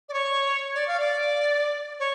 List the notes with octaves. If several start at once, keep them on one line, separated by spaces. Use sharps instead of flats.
D5
C#5
D5
F5
D5
C#5